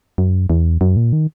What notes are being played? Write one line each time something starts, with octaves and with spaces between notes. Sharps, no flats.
F#2
E2
F#2
A#2
D#3